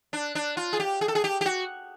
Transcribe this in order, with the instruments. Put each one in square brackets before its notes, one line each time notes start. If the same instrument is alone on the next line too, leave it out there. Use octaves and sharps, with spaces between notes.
[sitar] D4
D4
F4
G#4
G4
G#4
A4
G#4
G4
G4
F#4